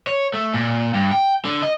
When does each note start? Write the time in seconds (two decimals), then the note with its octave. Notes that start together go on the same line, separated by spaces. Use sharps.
0.07 C#5
0.34 A3
0.54 A#2
0.94 G2
1.11 G5
1.45 D3
1.62 D#5